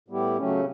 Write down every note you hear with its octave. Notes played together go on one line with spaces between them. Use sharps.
A2 G3 B3 E4 G4
C#3 F#3 A3 C#4